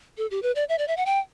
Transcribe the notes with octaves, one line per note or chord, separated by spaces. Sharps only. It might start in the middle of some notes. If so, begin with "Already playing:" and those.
A4
G4
B4
D5
E5
D5
E5
F#5
G5